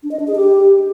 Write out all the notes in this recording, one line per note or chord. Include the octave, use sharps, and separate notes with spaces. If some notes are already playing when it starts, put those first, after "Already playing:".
D4
D#5
D4
G#4
G4